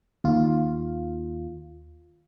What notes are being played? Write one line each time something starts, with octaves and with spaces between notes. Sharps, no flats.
D#2 F4